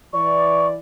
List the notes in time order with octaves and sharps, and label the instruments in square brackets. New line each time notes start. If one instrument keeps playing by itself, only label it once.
[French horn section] E3 D5 [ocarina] C#6